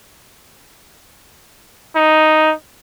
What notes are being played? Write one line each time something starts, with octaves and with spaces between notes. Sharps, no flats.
D#4